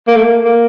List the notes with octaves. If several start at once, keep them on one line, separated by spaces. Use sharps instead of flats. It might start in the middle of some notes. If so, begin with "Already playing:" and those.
A#3
A3
A#3
A#3